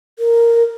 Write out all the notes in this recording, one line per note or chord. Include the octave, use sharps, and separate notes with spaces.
A#4